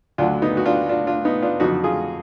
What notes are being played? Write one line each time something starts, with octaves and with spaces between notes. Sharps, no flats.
D2 D3 F#3 D4 F4
B3 D#4
F#4
D4 F4
D4 F4
D4 F4
B3 D#4
D4 F4
F2 D3 F#3 D#4 F#4
F4 G#4